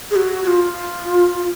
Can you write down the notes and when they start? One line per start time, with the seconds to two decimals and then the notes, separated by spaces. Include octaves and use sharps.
0.11 G#4
0.16 F#4
0.44 F#4
0.48 F4